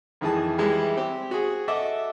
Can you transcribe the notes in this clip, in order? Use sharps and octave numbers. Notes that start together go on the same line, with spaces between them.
F2 D#3 E3 G#4 A5
E3 G3 G#3 E4 G4
C4 G4
F#4 G#4
A4 D#5 E5 F#5 D6